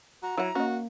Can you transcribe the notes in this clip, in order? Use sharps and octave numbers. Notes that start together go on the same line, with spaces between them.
F#4 A#5
F#3 E4 C#5 F#5
A#3 C#4 F#4 D#5